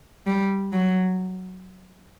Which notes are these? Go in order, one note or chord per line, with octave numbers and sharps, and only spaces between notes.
G3
F#3